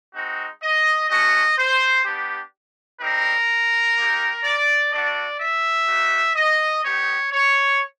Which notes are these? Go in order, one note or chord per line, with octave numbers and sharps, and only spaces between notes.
G#3 C4 D#4 F#4
D#5
A3 C#4 F#4 D#5
C5
B3 D4 G4
G3 C4 D#4 A#4
A#3 D#4 G4
D5
A3 D4 F#4 D5
E5
A#3 D#4 F#4
D#5
B3 D#4 G4 C#5
C#5